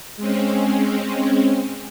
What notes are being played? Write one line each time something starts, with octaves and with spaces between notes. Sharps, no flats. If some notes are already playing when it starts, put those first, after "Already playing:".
G#3 C4 C#4